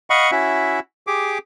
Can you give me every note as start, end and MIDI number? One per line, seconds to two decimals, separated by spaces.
0.10 0.31 75
0.10 0.31 77
0.10 0.31 78
0.10 0.31 83
0.10 0.31 85
0.31 0.80 61
0.31 0.80 64
0.31 0.80 66
0.31 0.80 76
1.07 1.38 67
1.07 1.38 68
1.07 1.38 86